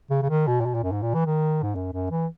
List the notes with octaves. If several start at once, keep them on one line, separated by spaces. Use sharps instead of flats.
C#3
C#3
D#3
B2
A#2
B2
A#2
F#2
G#2
A#2
E3
D#3
G#2
F#2
F#2
E3